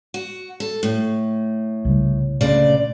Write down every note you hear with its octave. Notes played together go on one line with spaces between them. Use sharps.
F#4
A4
A2
C2 C#3 G3
D2 A#2 C#3 D5